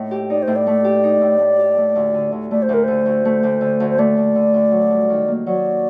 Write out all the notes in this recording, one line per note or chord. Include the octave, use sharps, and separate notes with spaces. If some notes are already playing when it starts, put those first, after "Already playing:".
Already playing: A2 A3 D#4
G4
D#4 D5
C5
A2
D5
A3
G4
D#4
A2
A3
G4
A3
D2
D3
D2
A3 D5
C5
D2 A#4
D3 C5
D2
A3
D2
D3
D2
C5
A3 D5
D2
D3
D2
F#3
G2
D#3
A#3
F#3 D5